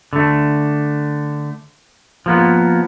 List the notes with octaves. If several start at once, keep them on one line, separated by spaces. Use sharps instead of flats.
D3 A3
F3 A#3 B3